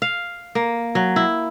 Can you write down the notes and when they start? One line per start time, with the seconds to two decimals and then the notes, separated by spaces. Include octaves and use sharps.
0.02 F5
0.55 A#3
0.95 F#3
1.16 E4